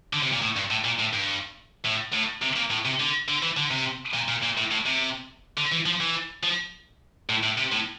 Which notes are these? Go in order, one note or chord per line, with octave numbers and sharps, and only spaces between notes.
D3
C3
A#2
A2
G2
A2
A#2
A2
G2
A2
A2
C3
A#2
A2
C3
D3
D3
E3
D3
C3
A#2
A#2
A#2
A2
A2
C3
D3
E3
F3
E3
F3
A2
A2
C3
A2